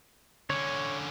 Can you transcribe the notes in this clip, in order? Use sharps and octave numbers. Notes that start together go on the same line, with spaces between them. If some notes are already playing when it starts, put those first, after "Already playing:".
D3 C#4 C#5